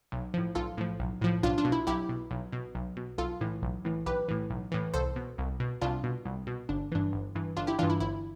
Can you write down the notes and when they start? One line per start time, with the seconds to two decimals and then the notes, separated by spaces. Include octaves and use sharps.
0.12 B1
0.34 A2 F3
0.55 B1 F4 A4
0.78 A2 F3
1.00 B1
1.22 A2 F3
1.43 B1 D4 F4
1.58 D4 F4
1.65 B2
1.72 E4
1.87 B1 E4 G4
2.09 B2
2.31 B1
2.52 B2
2.75 B1
2.97 B2
3.18 B1 F4 A4
3.41 A2 E3
3.63 B1
3.85 A2 E3
4.06 B1 G4 B4
4.28 A2 E3
4.50 B1
4.72 A2 E3
4.94 C2 A4 C5
5.16 B2
5.38 C2
5.60 B2
5.81 C2 D4 F4
6.04 B2
6.26 C2
6.47 B2
6.69 G1 D4
6.92 G2 E3 D4
7.13 G1
7.35 G2 E3
7.57 G1 D4 F4
7.67 E4 G4
7.79 G2 E3 D4 F4
7.90 E4
8.00 G1 E4